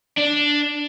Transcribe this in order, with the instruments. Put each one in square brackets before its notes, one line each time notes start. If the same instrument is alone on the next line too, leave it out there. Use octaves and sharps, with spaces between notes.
[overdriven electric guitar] D4